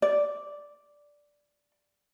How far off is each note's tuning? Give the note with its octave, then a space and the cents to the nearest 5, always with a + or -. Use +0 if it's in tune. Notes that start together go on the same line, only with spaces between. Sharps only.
D5 -5